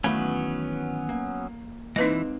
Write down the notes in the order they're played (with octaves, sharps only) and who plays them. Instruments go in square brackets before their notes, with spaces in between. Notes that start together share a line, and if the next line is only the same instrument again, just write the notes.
[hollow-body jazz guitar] D#3 E3 G#5 [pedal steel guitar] F#3 B3 C#4 [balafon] A3 B5
[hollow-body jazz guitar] A#3
[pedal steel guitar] E3 [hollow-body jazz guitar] G#3 A#3 C4 [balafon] D#4 B4 D#5